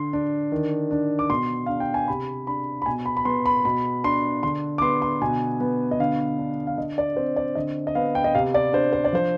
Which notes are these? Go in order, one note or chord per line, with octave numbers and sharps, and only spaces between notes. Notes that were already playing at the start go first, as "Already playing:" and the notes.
Already playing: D3 C6
D4
D#3
D4
D6
B2 C6
D4 F5
G5
G#5
C3 B5
D4 B5
B5
B2 G#5
B5
B5
B3 C6
B5
B2 B5
D4 C6
D3 C6
D6
B3 C6
C6
B2 G#5
B3
D#5
D3 F5
D4
F5
D3 D#5
D5
C4 C5
D5
D3 D#5
D#5
B3 F5
G5
D#5
C3 F5
D5
D4 C5
C5
D5
F3 C5